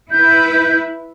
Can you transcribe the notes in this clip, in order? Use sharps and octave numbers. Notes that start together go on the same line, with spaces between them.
E4 B4 G6